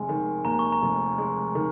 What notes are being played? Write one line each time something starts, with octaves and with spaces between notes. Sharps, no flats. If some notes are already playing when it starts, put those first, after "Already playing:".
Already playing: F1 G#3 G#5
D#3
D#2 A#5
C#6
A#5
F1
G#3
D#3